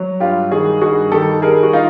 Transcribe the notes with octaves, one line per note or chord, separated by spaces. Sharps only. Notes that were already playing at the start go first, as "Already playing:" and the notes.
Already playing: F#3
G2 F4 G4
D#3 F#4 G#4
G2 F#4 G#4
D#3 G4 A4
G3 G#4 A#4
F#4
D#4 F4